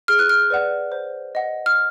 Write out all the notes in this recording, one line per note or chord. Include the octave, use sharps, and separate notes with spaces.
G#4 F6
F#6
F6
B4 D5 F#5
C5
D#5 F#5
F6